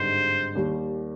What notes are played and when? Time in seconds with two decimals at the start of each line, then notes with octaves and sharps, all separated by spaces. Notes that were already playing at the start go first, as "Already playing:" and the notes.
Already playing: G#1 G2 D3 G#3 D#4 C5
0.55 D#2 D#3 G3